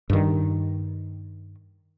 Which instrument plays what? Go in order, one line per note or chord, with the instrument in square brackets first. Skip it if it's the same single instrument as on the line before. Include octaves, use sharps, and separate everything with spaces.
[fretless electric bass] G2 D#3